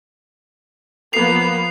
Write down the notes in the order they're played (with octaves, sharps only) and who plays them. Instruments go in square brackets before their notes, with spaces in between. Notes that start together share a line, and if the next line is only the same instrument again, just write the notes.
[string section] F3 A#3 B3 [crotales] C7 F7